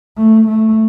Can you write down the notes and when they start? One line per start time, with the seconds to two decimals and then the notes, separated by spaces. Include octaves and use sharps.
0.17 A3
0.47 A3